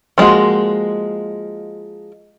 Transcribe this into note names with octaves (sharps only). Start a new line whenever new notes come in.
F3 G#3 A#3 F#4